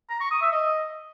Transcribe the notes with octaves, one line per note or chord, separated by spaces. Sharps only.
A#5
C#6
D#6
E5
D#5